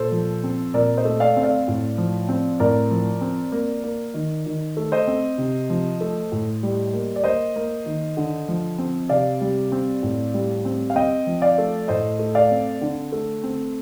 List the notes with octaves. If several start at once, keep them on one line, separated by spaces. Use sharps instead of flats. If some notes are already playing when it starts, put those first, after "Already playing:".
Already playing: A#2 A4 C5
F3
C4
A#2 A#4 D5
C5 D#5
A3
D5 F5
C4
D5 F5
A2
F3
C4
A2 A#4 D5
F3
C4
A#3
A#3
D#3
D#3
A3
C5 D#5
C4
C3
F3
A3
A2
G3
A#3
D5
A#3 C5 D#5
A#3
D#3
D3
F3
C4
C3 D5 F5
G3
C4
A2
G3
C4
F5
C4 D#5 G5
F3
D5 F5
A3
A2 C5 D#5
A3
D5 F5
C4
D3
A3
C4